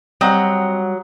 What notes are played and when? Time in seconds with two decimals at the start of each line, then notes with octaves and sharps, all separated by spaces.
0.21 F#3 G3 C4 D#5 F#5 A#5 D#6 G6